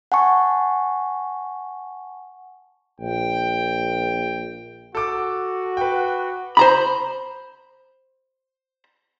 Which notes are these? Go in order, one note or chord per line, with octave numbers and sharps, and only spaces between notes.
F#5 G#5 A5 C#6
A#1 G5
F#4 A4 D6
B4 G5
C5 A#5 B5